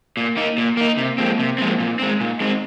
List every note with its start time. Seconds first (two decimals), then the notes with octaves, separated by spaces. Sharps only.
0.17 A#2 A#3
0.37 A#3 D#4
0.57 A#2 A#3
0.77 A#3 D#4
0.97 C3 A#3
1.18 F3 G#3 C4
1.39 C3 C4
1.58 F3 G#3 C4
1.79 A#2 D#4
1.99 G#3 C4
2.20 A#2
2.41 G#3 C4